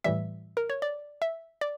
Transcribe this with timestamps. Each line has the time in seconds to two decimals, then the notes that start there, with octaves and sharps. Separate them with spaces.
0.04 A2 E3 G3 E5
0.57 A#4
0.70 C#5
0.82 D5
1.22 E5
1.61 D5